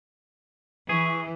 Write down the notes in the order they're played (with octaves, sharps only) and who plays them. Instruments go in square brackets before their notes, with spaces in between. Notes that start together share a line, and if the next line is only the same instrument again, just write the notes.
[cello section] E3 [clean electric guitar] G#4 [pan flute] C#6